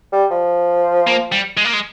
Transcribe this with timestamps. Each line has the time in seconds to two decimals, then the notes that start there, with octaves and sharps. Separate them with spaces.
0.12 G3
0.31 F3
1.07 A#3
1.32 G3
1.57 G#3
1.65 A#3
1.73 G#3